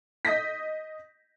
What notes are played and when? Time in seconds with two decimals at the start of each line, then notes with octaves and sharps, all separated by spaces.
0.25 D#5 D#6 G6 A#6 B6